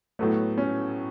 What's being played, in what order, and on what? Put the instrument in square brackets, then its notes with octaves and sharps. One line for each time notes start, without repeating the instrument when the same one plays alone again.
[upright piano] A2 F#3 B3 [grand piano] A3
[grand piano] C#4